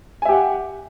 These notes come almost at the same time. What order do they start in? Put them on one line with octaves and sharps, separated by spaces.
G#5 E5 G4 F#5